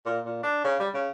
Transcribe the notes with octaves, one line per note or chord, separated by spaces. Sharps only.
A#2
A#2
D4
C#3
G3
C#3